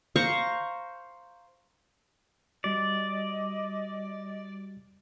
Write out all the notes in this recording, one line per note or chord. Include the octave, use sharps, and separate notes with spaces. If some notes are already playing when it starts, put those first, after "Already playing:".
C5 F5 A#5 C#6
G3 F#4 D5 D#5